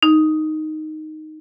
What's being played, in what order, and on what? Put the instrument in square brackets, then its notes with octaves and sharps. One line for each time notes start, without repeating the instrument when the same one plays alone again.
[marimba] D#4